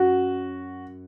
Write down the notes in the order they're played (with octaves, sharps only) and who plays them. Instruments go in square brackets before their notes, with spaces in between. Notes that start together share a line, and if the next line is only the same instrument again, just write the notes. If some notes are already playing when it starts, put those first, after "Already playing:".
Already playing: [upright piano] F#2 F#4